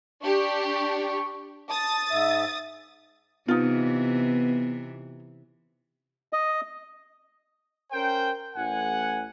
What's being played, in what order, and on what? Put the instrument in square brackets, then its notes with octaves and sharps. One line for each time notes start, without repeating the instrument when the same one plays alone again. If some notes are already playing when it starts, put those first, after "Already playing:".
[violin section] D4 G4 [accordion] C#6
[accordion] A5 [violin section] D#6 A6
[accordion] G#2 E5
[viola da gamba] C3 E3 [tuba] B3 [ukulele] D#4 F4
[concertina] D#5
[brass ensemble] C#4 A#4 C5 G5
A1 F#5 G#5